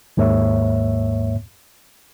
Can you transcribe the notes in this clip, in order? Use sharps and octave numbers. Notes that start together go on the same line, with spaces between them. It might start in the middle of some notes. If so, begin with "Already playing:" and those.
D#2 G#2 A#3 C#5 E5